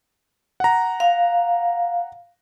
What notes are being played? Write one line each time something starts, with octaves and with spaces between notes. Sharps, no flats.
F#5 A#5
F5